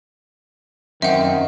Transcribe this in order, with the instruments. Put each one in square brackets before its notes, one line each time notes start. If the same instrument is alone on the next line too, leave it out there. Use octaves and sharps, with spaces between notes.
[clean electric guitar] F#2 C4 [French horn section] D#3 [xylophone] E5 F#5